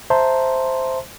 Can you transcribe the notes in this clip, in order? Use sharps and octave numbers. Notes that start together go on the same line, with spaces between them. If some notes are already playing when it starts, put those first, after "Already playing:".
C5 E5 A5 A#5 C6